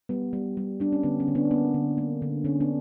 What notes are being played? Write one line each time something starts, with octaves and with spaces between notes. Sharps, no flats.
G3 B3
G3
G3
G3 D4
C#4
D3 B3
C#4
D3
B3 D4
A#3 B3
D3
A#3
D3
D3 C#4
B3 D4